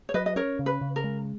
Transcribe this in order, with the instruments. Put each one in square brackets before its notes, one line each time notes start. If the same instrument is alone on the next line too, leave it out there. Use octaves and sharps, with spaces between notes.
[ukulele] C#5
[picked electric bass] F#3 [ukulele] B4 D#5
[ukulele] D#5
[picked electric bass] C#4 [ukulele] A#4 C#5
[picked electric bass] C#3
[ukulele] B4
[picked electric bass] C#3
[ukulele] A#4
[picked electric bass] G#3